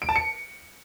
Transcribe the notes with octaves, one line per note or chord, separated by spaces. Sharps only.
D7
A5
C#7